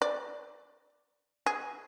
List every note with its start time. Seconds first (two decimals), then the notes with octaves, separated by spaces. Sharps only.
0.02 D5
1.46 G#4